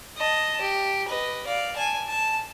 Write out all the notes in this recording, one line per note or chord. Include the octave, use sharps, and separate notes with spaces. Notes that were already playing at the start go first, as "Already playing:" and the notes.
D#5 A5
G4
B4 D#5
D5 F5
G#5 A5
A5